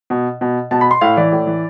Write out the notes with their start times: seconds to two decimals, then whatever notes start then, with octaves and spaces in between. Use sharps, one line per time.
0.10 B2
0.41 B2
0.71 B2 A5
0.81 B5
0.91 C6
1.01 A2 F5
1.17 E3 D5
1.32 A2
1.47 E3